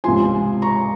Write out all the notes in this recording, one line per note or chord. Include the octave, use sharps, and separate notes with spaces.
C#2 C3 F3 G#5 C6
A#5 C#6